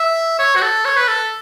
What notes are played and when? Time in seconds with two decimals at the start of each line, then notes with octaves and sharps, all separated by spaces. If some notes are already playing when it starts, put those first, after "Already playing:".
Already playing: E5
0.39 C#5
0.56 F#4
0.62 A4
0.85 C#5
0.97 B4
1.08 A4